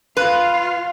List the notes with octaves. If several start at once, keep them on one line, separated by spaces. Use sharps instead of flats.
F4 B4 F5